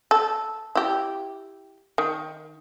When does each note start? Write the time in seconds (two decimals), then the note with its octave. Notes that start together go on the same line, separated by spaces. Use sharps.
0.11 A4
0.75 E4 G4
1.98 D#3